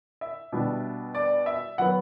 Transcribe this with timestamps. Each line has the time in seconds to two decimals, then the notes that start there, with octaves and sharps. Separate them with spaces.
0.21 E5
0.52 B2 G3 D4
1.15 D5
1.46 E5
1.78 F#3 B3 F#5